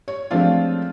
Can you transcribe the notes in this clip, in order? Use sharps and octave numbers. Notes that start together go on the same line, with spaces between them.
C#5
F3 G#3 A3 C4 D4 F4